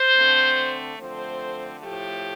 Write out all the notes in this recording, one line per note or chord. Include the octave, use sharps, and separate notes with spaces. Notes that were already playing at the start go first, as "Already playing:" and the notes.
Already playing: C5
D3 A3 C4
D3 F3 A3 C4 C5
A2 F3 A3 G4